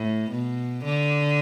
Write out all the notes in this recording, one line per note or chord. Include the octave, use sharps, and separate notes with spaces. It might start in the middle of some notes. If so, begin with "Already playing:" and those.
Already playing: A2
B2
D3